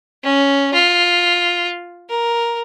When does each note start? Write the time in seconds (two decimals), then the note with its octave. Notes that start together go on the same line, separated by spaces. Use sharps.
0.23 C#4
0.74 F4
2.10 A#4